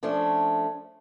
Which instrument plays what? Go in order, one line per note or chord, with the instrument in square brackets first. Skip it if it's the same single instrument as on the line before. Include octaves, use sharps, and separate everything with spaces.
[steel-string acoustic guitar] F3 A3 C#4 D4